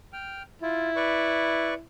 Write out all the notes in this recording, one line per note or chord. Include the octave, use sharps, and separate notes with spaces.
G5 F6
E4 F4
B4 D5 C#6